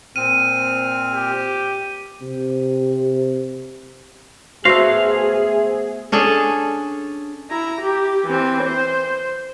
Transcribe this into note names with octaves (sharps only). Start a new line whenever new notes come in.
A#2 C4 F6 D#7
G4
C3
A3 B3 F#4 G#4 C5 E5 F5
C#4 D4 G#4 A4
E4 A#5
G4
E3 C4
C5